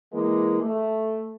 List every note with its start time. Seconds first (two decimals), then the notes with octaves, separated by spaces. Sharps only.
0.13 E3 G#3 A#3
0.62 A3